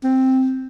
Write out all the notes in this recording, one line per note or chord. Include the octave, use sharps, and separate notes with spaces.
C4